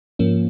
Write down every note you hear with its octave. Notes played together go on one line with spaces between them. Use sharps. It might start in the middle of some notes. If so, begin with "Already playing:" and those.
G#2 F3 A#3 C#4